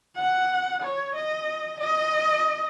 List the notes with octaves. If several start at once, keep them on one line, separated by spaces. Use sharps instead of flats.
F#5
C#5
D#5
D#5